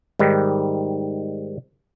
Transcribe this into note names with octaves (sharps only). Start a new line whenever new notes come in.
G#2 D#3 G3